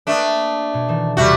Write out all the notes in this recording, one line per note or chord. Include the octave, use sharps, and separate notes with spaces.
A3 A#3 D4 B4 D#6
B2
D#3 E3 A4
E2 C3 G3 A3 F#4